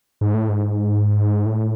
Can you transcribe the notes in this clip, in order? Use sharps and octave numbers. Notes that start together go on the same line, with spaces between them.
G#2
A2
G#2
A2